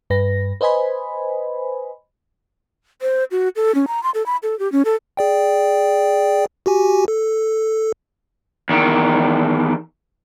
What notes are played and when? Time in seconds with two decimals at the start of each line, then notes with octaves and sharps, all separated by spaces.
0.10 G2 B4 A#6
0.61 B4 C5 D#5 G#5 B5
3.02 C5
3.31 F#4
3.56 A4
3.75 C#4
3.88 A#5
4.03 C6
4.14 A4
4.26 B5
4.43 A4
4.59 G4
4.72 C#4
4.85 A4
5.17 G#4 D5 G5
6.66 F#4 G4 G#5
7.08 A4
8.69 E2 D#3